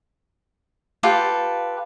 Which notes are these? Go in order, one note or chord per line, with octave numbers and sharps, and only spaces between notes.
F4 G4 A4 B4